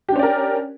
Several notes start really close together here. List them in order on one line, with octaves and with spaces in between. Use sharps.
G4 D4 C#4 D5 A#4